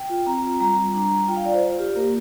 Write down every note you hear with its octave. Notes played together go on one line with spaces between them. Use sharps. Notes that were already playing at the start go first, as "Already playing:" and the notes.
Already playing: G5
F4
C4 A#5
F4
G3 A#5
G3
D4
G3
F4 G5
F5
F4 D5
C5
F4
F4 G4
A#3 A#4